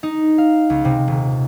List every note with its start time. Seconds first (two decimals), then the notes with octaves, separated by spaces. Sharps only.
0.03 D#4
0.38 F5
0.70 C#2
0.85 C3
1.08 D#1